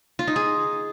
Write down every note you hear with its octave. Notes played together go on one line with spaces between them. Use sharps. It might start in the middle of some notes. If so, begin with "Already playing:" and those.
F4
D#4
G#4